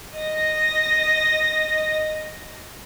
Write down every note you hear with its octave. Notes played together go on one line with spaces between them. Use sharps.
D#5 A#6